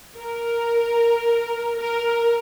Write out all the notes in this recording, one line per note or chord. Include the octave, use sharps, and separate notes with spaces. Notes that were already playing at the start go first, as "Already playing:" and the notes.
A#4
A#4